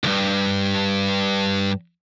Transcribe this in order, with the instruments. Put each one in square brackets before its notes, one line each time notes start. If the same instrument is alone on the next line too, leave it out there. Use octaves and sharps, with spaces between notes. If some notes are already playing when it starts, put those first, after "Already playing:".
[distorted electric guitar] C2 G2